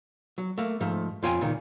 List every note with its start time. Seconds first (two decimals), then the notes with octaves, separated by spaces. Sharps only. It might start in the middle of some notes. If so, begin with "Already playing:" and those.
0.38 F#3
0.58 A3 A#3
0.81 G#2 F3 A3
1.23 F2 F4 C#5 G5 G#5
1.41 C#2 A#2 D#3